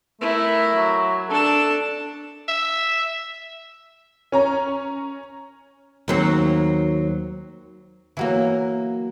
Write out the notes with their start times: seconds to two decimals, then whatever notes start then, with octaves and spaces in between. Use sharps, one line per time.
0.21 A3 E4 A#4
0.74 F#3
1.30 D4 A4 A5
2.48 E5
4.32 C#4 C#5 A#5
6.08 D#2 F#3 C4
8.17 E3 F#3 A#3